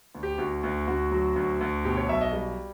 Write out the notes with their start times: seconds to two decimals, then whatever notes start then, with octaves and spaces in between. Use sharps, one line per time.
0.15 D2
0.23 G4
0.38 D2 F#4
0.63 D2
0.87 D2 F#4
1.11 F#3
1.36 D2
1.61 D2
1.84 B2 G4
1.97 C#5
2.09 B1 E5
2.21 D#5
2.33 G3